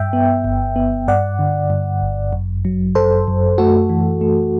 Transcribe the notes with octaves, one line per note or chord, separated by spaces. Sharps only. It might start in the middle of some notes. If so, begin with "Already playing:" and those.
Already playing: G2 E5 G5
B3
G1
B3
G2 D5 F#5
D3
G2
G1
F#2
F#3
F#2 A4 C5
F#2
A3 F#4 A4
E3
A3